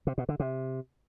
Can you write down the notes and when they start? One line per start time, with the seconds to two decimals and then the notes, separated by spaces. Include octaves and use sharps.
0.07 C3
0.18 B2
0.29 D3
0.40 C3